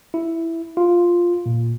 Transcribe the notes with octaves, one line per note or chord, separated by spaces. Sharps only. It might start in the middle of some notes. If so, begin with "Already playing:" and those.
E4
F4
A#2